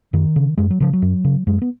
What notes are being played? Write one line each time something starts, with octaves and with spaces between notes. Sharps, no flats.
F#2 D#3
C#3
F#2 G#3
F#3
C#3 F3
F#3
F#2
C#3
F#2 G#3
B3